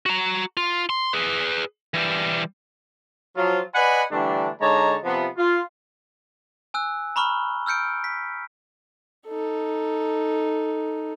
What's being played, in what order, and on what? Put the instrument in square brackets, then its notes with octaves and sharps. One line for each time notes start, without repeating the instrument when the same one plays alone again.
[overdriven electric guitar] F#4 A#5
F4
C6
G#4 B4
E3 G3
[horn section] F3 F#3 F4
B4 D5 D#5 F#5 G#5 B5
D3 E3 G3 A3 D4
D3 G#3 D#4 C#5 A5 A#5
C3 F3 B3
F4
[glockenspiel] G#5 E6 F#6
A#5 B5 C#6 F6 G7
E6 F6 G6 C#7 D7
B6
[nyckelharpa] D#4 A4